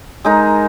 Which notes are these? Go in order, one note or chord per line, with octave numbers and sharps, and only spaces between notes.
G#3 D#4 A#4